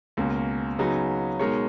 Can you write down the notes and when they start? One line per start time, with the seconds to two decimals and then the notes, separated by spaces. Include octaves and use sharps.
0.17 C#2 B2 A#3 C#4
0.79 C#3 F#3 B3 D#4 G#4
1.39 B2 G#3 D#4 A#4 C#5